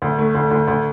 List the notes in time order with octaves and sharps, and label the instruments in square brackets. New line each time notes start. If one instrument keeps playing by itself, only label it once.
[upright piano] D2
A3
D2
D2
D2